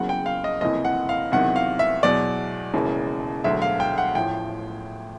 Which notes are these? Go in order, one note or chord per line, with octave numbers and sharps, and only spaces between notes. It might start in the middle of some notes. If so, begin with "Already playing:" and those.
Already playing: F#1 E2 C#3 F#3 F#5
G5
F5
D#5
F#1 F2 C3 E3 D#5
F#5
F5
E2 C3 D#3 F#3 F#5
F5
E5
E2 B2 F#3 D5
E1 D#2 C#3 E3
E1 D2 D3 F#3 E5
F5
G5
F#5
A1 A2 F3 G5